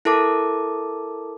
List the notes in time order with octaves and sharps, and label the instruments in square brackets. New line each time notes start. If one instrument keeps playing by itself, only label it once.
[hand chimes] E4 A4 A#4 A5 D6